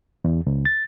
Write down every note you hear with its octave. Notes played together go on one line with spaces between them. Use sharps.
E2
C#2
A6